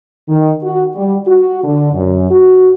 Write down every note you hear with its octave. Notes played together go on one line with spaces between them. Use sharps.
D#3
F#4
G3
F#4
D3
F#2
F#4